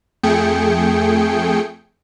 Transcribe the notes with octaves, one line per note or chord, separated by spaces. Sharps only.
F2 A3 G#4 G5 C#7